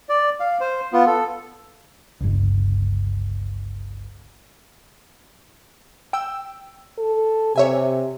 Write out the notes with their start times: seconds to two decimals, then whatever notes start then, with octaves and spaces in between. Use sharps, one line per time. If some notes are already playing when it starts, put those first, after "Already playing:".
0.09 D5
0.40 F5
0.60 C5
0.93 B3 F4
1.07 A4
2.21 G1 C#2
6.13 G5 E6
6.98 A4
7.56 C3 C#5 E5 G#5